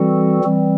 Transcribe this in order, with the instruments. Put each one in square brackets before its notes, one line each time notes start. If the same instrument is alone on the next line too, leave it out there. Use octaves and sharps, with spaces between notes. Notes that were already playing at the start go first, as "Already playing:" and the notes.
Already playing: [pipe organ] E3 G3 C4 F#4 A4
E3 G3 C4